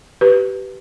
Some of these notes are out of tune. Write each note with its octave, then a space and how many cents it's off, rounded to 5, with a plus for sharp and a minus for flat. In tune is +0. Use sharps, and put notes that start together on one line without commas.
G4 -25 B4 +0